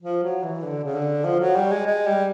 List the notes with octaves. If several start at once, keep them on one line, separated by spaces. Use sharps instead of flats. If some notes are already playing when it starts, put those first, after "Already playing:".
F3
F#3
E3
D3
C#3
D3
F3
F#3
G3
G#3
G#3
G3